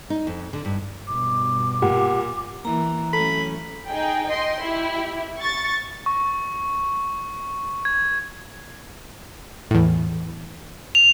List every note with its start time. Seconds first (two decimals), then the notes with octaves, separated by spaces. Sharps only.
0.10 D#4
0.27 F2
0.53 D3
0.65 G2
1.07 G2 B2 D6
1.82 A#2 G4 F#5
2.65 E3 A#3 A#5
3.13 F#3 A3 C#4 A4 B5
3.88 D#4 G#4 G5
4.28 D#5 G5 C6
4.62 E4 G4
5.38 C#6 A6
6.06 C#6
7.85 G#6
9.71 E2 A2
10.95 F7